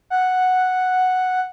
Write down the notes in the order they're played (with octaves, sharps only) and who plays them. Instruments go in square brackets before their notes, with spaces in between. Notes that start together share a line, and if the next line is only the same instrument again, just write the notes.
[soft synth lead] F#5